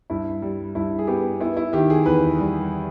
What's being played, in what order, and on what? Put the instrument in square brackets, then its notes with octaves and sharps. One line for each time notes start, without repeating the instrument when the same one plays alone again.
[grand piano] G2 E4
G3
G2 E4
G#4
B3 G4
B3 E4
E4
D#3 G4
G#4
E2 B4
G3